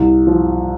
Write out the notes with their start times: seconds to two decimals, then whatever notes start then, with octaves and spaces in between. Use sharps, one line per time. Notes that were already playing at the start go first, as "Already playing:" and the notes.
Already playing: C2
0.27 F3